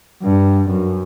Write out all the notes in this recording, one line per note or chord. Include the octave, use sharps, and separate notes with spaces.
G2
F#2